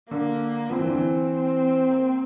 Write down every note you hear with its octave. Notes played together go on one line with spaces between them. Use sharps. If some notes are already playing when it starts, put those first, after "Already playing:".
D3 A#3
F3 C4
E3
D3
E3
C4
A#3